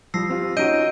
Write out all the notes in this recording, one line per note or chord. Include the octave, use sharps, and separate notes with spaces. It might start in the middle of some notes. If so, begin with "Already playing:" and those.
F3 G3 E6 A#6 C7
C4 F4 G4
C#4 D#4 F#4 D#5 G6 D7 D#7